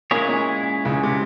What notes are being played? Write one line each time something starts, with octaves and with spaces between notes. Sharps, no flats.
A#2 G#3 A#3 C#4 E4 G#4 C#5
A#2 A#3
C#2 C#3
C3